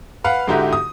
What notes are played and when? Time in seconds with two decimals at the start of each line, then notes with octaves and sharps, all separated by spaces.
0.24 B4 F5 F#5
0.48 G#2 D3 D#4 E4 F#4 G4
0.73 D#6